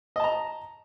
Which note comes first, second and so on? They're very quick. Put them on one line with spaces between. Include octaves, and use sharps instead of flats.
D#5 A5 A#5